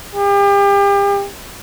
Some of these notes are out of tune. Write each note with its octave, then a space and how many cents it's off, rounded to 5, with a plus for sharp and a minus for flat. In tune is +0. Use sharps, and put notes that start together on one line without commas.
G4 +35